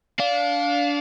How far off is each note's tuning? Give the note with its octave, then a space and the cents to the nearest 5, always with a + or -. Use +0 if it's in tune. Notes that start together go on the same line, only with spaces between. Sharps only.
D4 -25 F5 +10